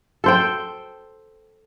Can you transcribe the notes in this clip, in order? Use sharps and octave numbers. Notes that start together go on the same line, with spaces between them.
A4 C5 G5